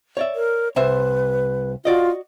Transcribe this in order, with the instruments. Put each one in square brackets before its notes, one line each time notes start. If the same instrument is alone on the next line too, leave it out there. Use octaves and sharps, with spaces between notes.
[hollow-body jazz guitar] C#5 D5 E5
[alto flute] A#4
[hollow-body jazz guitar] C2 C5 E5 [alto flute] B4
[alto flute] F4 [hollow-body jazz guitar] F#4 D5 D#5